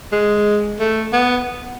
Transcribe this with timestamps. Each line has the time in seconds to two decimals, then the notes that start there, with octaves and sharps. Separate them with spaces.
0.13 G#3
0.80 A3
1.13 B3